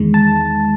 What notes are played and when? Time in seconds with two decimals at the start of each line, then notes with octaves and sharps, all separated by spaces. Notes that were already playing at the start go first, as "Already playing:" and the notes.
Already playing: E2 D#3 G#3
0.14 A5